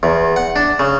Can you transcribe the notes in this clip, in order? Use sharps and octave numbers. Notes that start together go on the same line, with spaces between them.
E2
F#5
D4
C#3